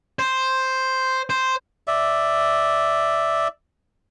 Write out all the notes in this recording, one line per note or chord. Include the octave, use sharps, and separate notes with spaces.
C5
C5
D5 E5